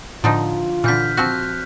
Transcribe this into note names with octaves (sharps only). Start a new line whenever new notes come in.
A2 D3 F3 D#4 F4
A#2 D3 E3 F6 G6 B6
F3 C4 F#4 F#6 G6